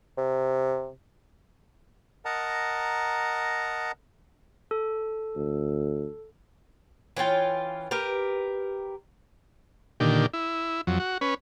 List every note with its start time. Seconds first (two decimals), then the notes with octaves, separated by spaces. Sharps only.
0.18 C3
2.25 A#4 D#5 F#5 A5 A#5
4.71 A4
5.36 D2
7.16 E3 C#4 F4 G5
7.91 G4 A#4 B4
10.00 A#2 D3 D#3 G4
10.33 E4
10.87 F2 F#3
11.00 F#4
11.21 C#4 B4